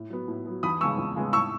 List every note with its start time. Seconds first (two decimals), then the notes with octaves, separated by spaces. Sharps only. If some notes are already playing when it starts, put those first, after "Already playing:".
Already playing: A2
0.10 F#3 B3
0.28 A2
0.46 F#3 B3
0.63 E2 B5 D#6
0.81 C#3 G#3 B3 C#6 E6
0.98 E2
1.16 C#3 G#3 B3
1.33 A2 C#6 E6